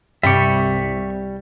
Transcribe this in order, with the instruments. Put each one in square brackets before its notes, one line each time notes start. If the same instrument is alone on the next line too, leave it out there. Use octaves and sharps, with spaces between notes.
[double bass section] C2 [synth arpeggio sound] G2 C3 D6 [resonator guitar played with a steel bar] G3 [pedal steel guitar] E5 B5 C#6